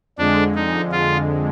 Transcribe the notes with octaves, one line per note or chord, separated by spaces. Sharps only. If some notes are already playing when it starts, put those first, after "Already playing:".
F2 D3 G#3 D4
D#4
F4